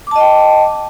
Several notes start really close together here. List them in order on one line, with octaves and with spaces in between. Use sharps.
D6 A5 D#5 G5